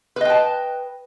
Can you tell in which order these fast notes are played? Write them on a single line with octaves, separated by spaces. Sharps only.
B4 D#5 G5 A5